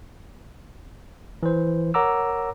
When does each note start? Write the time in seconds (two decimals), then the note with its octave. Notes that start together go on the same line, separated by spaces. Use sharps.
1.43 E3 C5
1.94 A#4 C#5 F#5 A#5 D6 E6